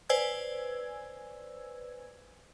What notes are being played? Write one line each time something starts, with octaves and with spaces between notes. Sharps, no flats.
B4 C5 D5 G#5 E6 G#6